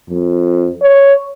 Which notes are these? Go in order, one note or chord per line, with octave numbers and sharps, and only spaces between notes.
F2
C#5